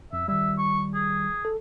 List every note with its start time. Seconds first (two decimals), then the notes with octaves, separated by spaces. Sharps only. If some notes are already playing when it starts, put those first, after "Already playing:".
0.13 F2 E5
0.28 D#3 G3 E5
0.59 C#6
0.94 G#4
1.45 A4